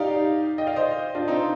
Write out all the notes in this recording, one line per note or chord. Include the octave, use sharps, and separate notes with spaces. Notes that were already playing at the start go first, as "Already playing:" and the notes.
Already playing: D#4 G4 D5 F5
D#5 G5
D5 F5
C5 D#5
D4 F4
C4 D#4